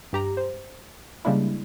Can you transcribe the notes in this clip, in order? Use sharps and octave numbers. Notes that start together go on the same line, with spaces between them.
G2 G4 A#5
C5
C#3 G3 G#3 A#3 D4 E4